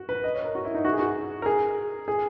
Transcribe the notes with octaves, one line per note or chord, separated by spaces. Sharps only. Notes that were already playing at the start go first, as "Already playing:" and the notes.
Already playing: F#4
B4
D#5
C#5
A#4
F#4
E4
D#4
F#4
G#4
F#4
A#4
G#4
G#4